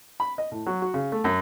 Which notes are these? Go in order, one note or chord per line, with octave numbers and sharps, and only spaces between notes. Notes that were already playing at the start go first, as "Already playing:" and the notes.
B5
D#5
A2
F#3
F#4
C#3
A3
F#2